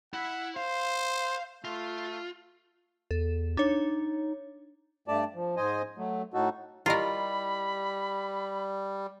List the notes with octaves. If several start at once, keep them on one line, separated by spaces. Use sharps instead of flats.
E4 F#5
C5 F5
A3 F4
E2 A4
D4 D#4 C#5
G2 A3 D5 A5
F3
G#2 C5 D#5 G#5
F#3 A3
A2 D#4 F#4 A4
G3 E4 F4 G4 A#4 D#5 B5